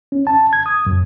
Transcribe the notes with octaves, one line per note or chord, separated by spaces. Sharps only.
C#4
A5
G#6
D#6
F#2